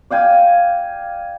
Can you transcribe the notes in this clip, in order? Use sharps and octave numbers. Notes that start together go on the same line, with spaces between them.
D5 F5 G5 G#5